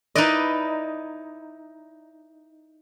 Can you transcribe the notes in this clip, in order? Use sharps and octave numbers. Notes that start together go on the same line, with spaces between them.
D#4 E4 B4 D5 D#5